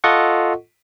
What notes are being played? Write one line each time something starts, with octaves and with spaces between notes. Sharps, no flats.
F4 A4 D#5 F#5 C#6